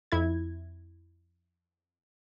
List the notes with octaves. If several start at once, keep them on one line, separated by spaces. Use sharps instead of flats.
F2 E4 G#6